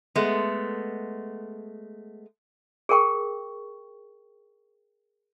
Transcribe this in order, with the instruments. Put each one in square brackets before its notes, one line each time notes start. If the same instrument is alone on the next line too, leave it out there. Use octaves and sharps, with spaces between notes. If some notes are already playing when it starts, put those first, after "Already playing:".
[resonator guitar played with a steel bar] G#3 A3 B3
[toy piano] G#4 A#4 G5 C#6